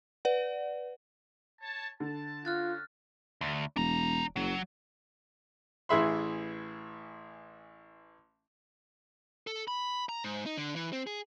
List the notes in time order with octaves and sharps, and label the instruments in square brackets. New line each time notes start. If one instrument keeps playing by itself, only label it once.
[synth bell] B4 D5 F#5
[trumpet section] C#5 A5
[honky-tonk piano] D3 [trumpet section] A5
[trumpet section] A#3 C#4 F#4 [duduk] F4 [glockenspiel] F6 F#6 A6
[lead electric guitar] D2
[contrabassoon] E1 [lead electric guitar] D4 A#5
[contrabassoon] F#1 [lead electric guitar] F#3
[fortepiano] A1 E3 G#4 E5 B5 C6
[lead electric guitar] A4
B5
A#5
G#2
D#4
D3
E3
C4
G#4